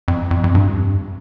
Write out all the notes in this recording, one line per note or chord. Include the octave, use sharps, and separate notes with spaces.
F2
F2
F2
G2